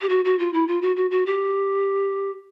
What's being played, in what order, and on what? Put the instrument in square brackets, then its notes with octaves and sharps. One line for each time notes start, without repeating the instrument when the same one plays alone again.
[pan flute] G4
F#4
F#4
F4
E4
F4
F#4
F#4
F#4
G4